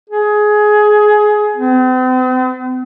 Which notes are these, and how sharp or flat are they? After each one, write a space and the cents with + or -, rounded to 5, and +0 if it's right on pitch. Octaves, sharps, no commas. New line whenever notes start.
G#4 +15
C4 -45